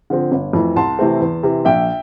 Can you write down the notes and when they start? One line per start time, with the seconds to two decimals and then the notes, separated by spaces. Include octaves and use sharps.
0.10 D3 F3 C4
0.32 G1
0.53 F2 E3 A3
0.76 C2 A5 C6
0.99 C3 E3 A3 C4
1.21 E2
1.43 C3 E3
1.65 A#1 E5 G5